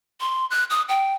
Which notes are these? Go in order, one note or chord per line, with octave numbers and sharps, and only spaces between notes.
C6
F#6
D#6
G5